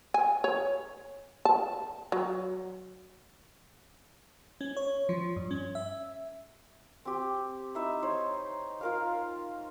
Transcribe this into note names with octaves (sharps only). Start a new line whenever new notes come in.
G#5
C#5
A5
F#3
C#4
C#5
F3
G2
C#4
E5
C4 G4
D#4 E4 E5
D#4 C5 C#5
F4 A#4 F5